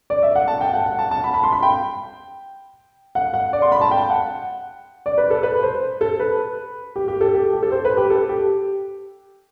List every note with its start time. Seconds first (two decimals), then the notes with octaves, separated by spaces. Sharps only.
0.10 D5
0.23 E5
0.35 F#5
0.48 A5
0.61 G5
0.73 F#5
0.86 F#5
0.99 A5
1.11 A5
1.24 B5
1.34 B5
1.43 C6
1.53 B5
1.63 G5
3.15 F#5
3.34 F#5
3.53 D5
3.62 C6
3.72 B5
3.81 A5
3.91 G5
4.10 F#5
5.06 D5
5.18 B4
5.30 A4
5.43 B4
5.62 C5
6.01 A4
6.20 B4
6.96 G4
7.08 G4
7.21 A4
7.34 G4
7.53 G4
7.62 A4
7.72 C5
7.85 B4
7.97 G4
8.10 A4
8.29 G4